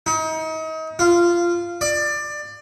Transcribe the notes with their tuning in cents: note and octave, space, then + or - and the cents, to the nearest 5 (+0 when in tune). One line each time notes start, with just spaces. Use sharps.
D#4 +35
F4 -15
D5 +20